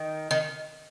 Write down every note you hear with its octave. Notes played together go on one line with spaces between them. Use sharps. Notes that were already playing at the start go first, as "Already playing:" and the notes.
Already playing: D#3
D#3